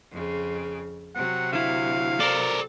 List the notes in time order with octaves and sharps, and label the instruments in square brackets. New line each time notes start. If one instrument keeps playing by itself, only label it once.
[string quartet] F2 C#3
[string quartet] C3 F#3 [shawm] F#5
[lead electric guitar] D3 E4 [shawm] F5
[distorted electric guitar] A4 A#4 [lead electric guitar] C5 D5